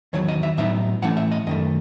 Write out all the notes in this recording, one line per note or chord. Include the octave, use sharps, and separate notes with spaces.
E2 D#3 F#3 C#5
D#5
E5
A2 F#3 B3 D#4 E5
A2 E3 A3 C#4 F#5
E5
D#5
F#2 D#3 A3 D#5